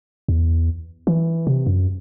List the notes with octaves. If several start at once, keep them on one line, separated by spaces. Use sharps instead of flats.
E2
E3
C3
F#2